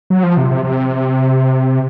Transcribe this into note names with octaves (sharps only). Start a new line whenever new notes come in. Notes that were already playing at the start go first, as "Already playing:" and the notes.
F#3
F3
C3
C3
C3